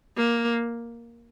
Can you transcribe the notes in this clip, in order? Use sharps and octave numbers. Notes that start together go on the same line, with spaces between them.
A#3